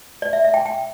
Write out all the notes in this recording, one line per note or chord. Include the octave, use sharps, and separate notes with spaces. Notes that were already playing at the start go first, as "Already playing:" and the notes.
D5
E5
E5
G5
G5